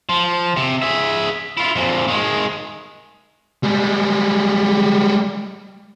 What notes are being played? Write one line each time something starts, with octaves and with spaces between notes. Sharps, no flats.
F3
C3
G#4 E5
E4 F4
F2 A#2
D#3 G#3
G3 G#3